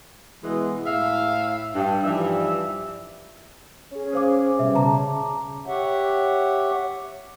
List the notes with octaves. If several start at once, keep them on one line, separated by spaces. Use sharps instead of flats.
B2 E3 G#3
A2 E5 F5
G2
G2 E3 F3 G3 D#4 E5
C#4 G#4
C5 F5 D6
B2 G3 E5
C#3 A5 A#5 D6
G4 C#5 E5 F#5